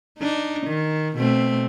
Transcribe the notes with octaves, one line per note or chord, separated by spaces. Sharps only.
D4 D#4
D#3
B2 A3 C4